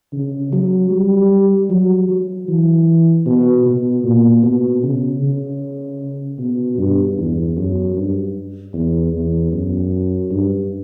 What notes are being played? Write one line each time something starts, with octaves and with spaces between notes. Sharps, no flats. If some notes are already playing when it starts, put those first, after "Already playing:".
C#3
F#3
G3
F#3
F#3
E3
B2
B2
A#2
B2
C#3
C#3
B2
G2
E2
F#2
G2
E2
E2
F#2
G2